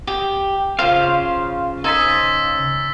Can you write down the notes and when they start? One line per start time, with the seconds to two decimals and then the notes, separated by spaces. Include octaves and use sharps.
0.07 G4
0.79 C#3 F4 C5 F5
1.84 D#4 C5 G#5 E6 A6 B6